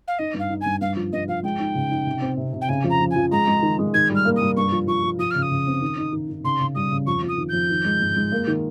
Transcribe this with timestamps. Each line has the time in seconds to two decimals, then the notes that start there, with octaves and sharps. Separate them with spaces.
0.07 F5
0.18 D#4 D#5
0.34 G2 F5
0.50 D#4
0.61 G2 G#5
0.81 G2 F5
0.96 F3
1.12 G2 D#5
1.28 F3 F5
1.43 G#3 G5
1.59 D#4
1.75 C#3
1.91 D#4
2.06 C3
2.21 C4
2.37 C3
2.53 C3
2.61 G5
2.69 C#3 G#5
2.84 F2
2.90 A#5
3.00 F3
3.11 F3 G#5
3.31 G#3 A#5
3.47 G#3
3.62 D#3
3.79 G#3
3.94 D#3 G#6
4.10 G3
4.15 F6
4.25 A#3
4.36 D#6
4.41 G3
4.57 G2 C#6
4.72 F3
4.87 F3 C#6
5.03 F3
5.19 F3 D#6
5.30 C#3 F6
5.42 D#6
5.50 C#3
5.67 C4
5.82 D#3
5.97 D#4
6.13 D#3
6.29 D#3
6.44 C#3 C6
6.60 C#3
6.75 G3 D#6
6.91 C#3
7.06 F2 C#6
7.23 F2
7.28 D#6
7.38 D#3
7.49 F2 G6
7.70 D#3
7.85 G#3
8.00 G#2
8.16 G#3
8.32 A#3
8.47 D#3